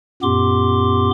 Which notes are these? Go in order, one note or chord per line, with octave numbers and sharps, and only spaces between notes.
F#2 A#2 B3 G4 C6 D6